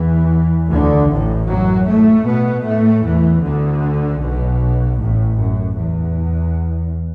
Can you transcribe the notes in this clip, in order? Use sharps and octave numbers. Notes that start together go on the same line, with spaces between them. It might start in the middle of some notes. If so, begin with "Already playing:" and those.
Already playing: E2 E3
D2 D3
A1 A2
F#2 F#3
A2 A3
B2 B3
A2 A3
E2 E3
D2 D3
B1 B2
A1 A2
F#2
E2